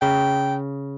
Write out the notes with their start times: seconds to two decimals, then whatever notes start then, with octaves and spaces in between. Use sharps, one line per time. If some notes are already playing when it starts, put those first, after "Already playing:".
0.01 C#3 G5